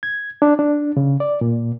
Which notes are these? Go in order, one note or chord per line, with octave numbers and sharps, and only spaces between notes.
G#6
D4
D4
C#3
D5
A#2